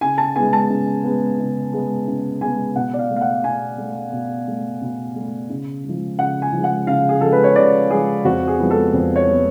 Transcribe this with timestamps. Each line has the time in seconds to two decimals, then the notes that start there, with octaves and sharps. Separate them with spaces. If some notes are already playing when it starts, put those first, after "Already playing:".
0.01 C#3 G#5
0.18 A5
0.36 G#3 B3 G#5
0.53 A5
0.69 C#3
1.04 G#3 B3
1.39 C#3
1.73 G#3 B3
2.07 C#3
2.41 G#3 B3 G#5
2.76 B2 F#5
2.93 D5
2.99 F5
3.10 A3
3.16 F5
3.21 F#5
3.44 B2 G#5
3.78 A3
4.12 B2
4.48 A3
4.82 B2
5.16 A3
5.50 C#3
5.84 F3 G#3
6.18 C#3 F#5
6.42 G#5
6.53 F3 G#3
6.64 F#5
6.87 C#3 F5
7.09 G#4
7.21 F3 G#3 A4
7.32 B4
7.44 C#5
7.55 C#3 D5
7.90 F3 G#3 G#4
8.24 F2 F#4
8.47 G#4
8.58 F3 G#3 B3
8.70 A4
8.93 F2
9.16 C#5
9.27 F3 G#3 B3